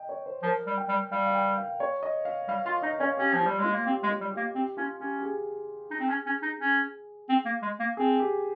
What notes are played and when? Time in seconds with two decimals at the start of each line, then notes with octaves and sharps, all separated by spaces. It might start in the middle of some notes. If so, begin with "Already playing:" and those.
Already playing: D#5 G5
0.09 C#5
0.26 C5
0.43 F3 A#4
0.67 G3
0.78 G5
0.88 G3
1.11 G3 F5
1.26 F5
1.35 G5
1.58 F5
1.80 C#5
2.03 D#5
2.25 F5
2.48 G3 F5
2.66 F4 F5
2.82 D#4 D#5
3.00 C#4 C#5
3.17 C#4 G4
3.33 F3
3.40 F4
3.46 G3
3.59 G#3 F4
3.73 A#3
3.86 C4 G4
4.03 G#3
4.09 F4
4.21 G3
4.31 G4
4.37 A#3
4.55 C4 G4
4.77 C#4 F4
4.99 C#4 G4
5.18 G4
5.23 G#4
5.91 D#4
6.00 C4
6.09 C#4
6.26 C#4
6.42 D#4
6.59 C#4
7.29 C4
7.45 A#3
7.62 G#3
7.80 A#3
7.97 C4 G#4
8.19 G4